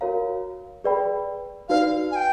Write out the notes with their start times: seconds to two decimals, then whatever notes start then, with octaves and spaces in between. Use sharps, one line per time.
0.01 F#4 A#4 C#5 F5 A#5
0.84 G#4 B4 D5 G5 B5
1.69 D#4 F#4 B4 D5 F5
2.11 G#5
2.16 G5